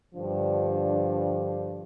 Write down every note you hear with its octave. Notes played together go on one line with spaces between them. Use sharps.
G2 D3 F3 D4